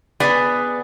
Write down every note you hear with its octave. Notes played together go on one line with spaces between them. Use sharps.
B3 G#4 D5 G#5